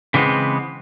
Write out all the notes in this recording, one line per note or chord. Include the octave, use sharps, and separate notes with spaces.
C#3 E3 G3 G#3 B3 C4